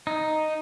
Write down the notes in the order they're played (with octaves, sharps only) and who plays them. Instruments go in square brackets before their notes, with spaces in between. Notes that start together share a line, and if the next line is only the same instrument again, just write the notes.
[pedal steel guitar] D#4